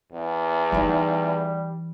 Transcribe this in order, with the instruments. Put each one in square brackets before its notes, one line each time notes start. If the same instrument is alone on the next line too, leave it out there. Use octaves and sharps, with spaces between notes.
[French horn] E2
[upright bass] E3 D#4 [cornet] G3